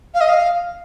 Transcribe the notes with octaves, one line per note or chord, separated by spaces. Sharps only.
F5
D#5
F5